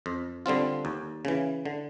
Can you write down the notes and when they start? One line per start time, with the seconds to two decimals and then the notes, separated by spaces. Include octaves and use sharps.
0.06 F2
0.46 D3 G3 C4 F4
0.85 D#2
1.25 C#3 E3
1.65 D3